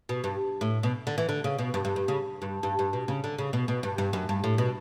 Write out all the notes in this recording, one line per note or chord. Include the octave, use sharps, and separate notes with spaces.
B2
G2
A2
B2
D3
E3
D3
C#3
B2
G2
G2
G2
C#3
G2
G2
G2
B2
C#3
D3
C#3
B2
B2
G2
G2
F#2
G2
A2
B2